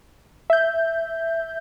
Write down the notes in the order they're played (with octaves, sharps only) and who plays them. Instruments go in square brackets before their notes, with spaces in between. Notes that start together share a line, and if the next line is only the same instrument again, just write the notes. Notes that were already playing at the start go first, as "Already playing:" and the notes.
[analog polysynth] E5 G6